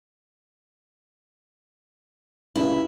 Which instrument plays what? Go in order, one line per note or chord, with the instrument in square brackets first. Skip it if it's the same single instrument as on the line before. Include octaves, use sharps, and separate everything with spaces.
[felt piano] C#2 C#3 [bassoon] G2 [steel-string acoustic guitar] E4